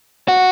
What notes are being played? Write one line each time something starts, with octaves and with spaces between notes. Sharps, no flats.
F#4